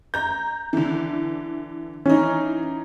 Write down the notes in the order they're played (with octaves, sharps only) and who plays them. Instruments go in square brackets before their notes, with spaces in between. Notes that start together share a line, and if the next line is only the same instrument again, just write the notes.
[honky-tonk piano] A#5 G6
D3 E3
[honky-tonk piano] E3 D#4 [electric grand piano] C#4